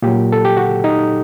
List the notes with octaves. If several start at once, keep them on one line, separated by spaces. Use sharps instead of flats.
A#2 F#3 G4
A4
G4
F#4
D#4